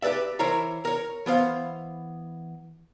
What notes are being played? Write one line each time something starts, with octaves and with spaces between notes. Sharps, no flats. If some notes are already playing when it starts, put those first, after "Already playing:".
G4 G#4 B4 D5 E5
E3 E4 A#4 C5 C#5 A#5
A#4 C#5
E3 B3 C5 F5